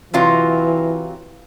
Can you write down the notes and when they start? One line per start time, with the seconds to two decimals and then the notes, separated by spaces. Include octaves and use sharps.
0.14 C3 E3 F#3 F4